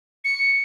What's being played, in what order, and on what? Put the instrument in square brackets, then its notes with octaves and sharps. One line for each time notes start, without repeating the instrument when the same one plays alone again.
[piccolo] C#7